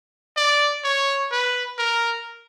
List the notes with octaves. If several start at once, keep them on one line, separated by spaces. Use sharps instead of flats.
D5
C#5
B4
A#4